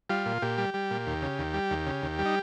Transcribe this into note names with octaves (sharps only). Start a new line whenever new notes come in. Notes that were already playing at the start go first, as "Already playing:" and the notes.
G3 F4
A#2
A#2 G4
G3
G3
A#2
D#2
C#3
D#2
G3
D#2
C#3
D#2
G3
D#4